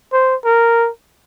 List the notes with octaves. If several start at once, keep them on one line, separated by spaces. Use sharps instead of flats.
C5
A#4